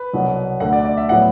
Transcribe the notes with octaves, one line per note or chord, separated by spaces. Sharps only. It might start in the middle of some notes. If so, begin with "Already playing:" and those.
Already playing: B4
C2 B2 F#3 B3
D2 D3 A3 F#5
D5
D5
E5
A2 F#3 B3 F#5